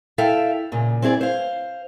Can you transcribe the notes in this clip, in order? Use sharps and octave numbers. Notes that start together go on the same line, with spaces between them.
E4 A4 E5 F5 G5 A5
A#2 C#3
C4 E4 G#4 D5
C5 F5